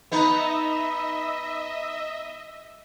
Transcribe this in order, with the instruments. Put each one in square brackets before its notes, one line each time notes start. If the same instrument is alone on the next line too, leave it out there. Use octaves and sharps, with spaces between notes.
[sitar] B3 D#4 B4 [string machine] D#5 E5